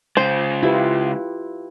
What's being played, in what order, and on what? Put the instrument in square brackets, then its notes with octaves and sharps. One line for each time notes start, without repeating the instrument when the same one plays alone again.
[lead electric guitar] C#3 G#3 [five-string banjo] C5
[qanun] E4 [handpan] F4 G4 B4